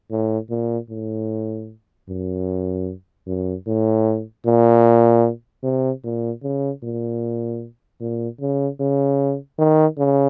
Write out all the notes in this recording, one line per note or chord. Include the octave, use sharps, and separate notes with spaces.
A2
A#2
A2
F#2
F#2
A2
A#2
C3
A#2
C#3
A#2
A#2
C#3
C#3
D#3
C#3